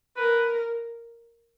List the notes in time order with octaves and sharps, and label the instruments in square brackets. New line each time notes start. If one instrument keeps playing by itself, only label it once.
[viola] A#4 [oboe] B4